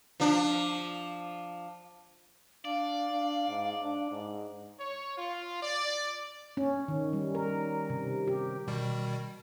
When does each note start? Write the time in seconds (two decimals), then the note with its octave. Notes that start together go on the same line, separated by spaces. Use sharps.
0.20 F3 D4
2.65 D4 D5 F5
3.12 D4
3.49 G#2
3.82 D4
4.12 G#2
4.78 C#5
5.18 F4
5.61 D5
6.57 C#4
6.88 D#3
7.13 G3
7.35 A#4
7.90 C3
8.28 G4
8.68 B2 D#3 G3